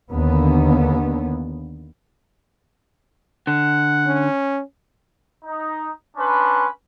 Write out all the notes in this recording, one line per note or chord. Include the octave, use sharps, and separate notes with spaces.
D#2 D3 B3
D3 F#5
C#4
D#4
C#4 D4 B4 C6